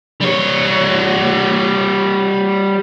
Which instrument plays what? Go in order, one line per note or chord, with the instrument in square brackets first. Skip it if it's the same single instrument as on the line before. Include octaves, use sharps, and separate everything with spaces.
[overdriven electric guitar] G3 C#5